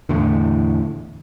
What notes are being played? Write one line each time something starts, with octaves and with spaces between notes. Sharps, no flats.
E2 A2 D3